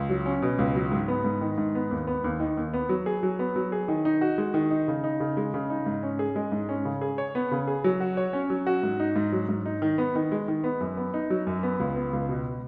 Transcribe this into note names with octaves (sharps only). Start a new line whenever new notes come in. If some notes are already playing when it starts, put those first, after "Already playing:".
Already playing: C#2
F#3
C#4
B2
C#2
F#3
G#2
B3
G#2
D#3
G#2
B3
D#2
B3
D#2
D#3
D#2
B3
F#3
G#4
F#3
B3
F#3
G#4
D#3
D#4
F#4
G#3
D#3
D#4
C#3
D#4
C#3
G#3
C#3
D#4
G#2
C#4
G#4
G#3
G#2
C#4
C#3
G#4
C#5
B3
C#3
G#4
F#3
F#4
C#5
C#4
F#3
F#4
G#2
D#4
G#2
F#3
G#2
D#4
D#3
B3
D#3
G#3
D#3
B3
F#2
B3
D#4
F#3
F#2
B3
C#2
B3
C#2
B2